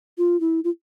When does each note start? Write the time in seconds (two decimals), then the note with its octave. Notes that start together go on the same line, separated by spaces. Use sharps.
0.18 F4
0.41 E4
0.64 F4